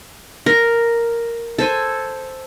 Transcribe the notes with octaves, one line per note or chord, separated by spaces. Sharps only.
A#4
A4 C5 G#5